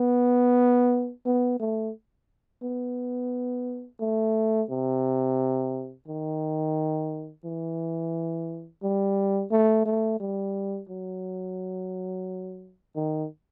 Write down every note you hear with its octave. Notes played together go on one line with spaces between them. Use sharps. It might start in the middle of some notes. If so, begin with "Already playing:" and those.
Already playing: B3
B3
A3
B3
A3
C3
D#3
E3
G3
A3
A3
G3
F#3
D#3